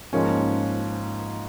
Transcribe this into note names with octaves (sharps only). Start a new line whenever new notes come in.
G#2 F3 A#3 C#4